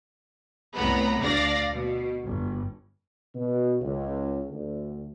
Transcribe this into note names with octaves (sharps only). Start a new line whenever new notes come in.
C2 A2 B3 A#5 B5
D2 D4 D5 F5 A#6
B2
G1
B2
C#2
D2